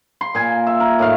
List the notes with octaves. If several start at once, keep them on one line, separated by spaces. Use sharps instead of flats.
C6
A#2 G#5
E5
A#4
A2 D#3 F5